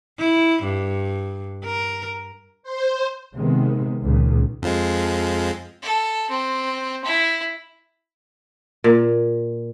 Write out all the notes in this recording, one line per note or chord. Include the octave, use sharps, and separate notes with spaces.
E4
G2
A#4
C5
C3 D#3 G#3 B3 C4
C#2 A#2 D#3
F2 F3 G#3
A4
C4
E4
A#2